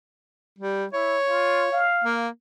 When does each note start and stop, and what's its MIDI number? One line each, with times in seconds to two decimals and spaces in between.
0.59 0.85 55
0.93 1.19 64
0.93 1.88 73
1.28 1.68 65
1.72 2.16 77
2.05 2.29 58